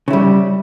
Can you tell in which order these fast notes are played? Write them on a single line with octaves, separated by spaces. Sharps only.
C#3 E4 G3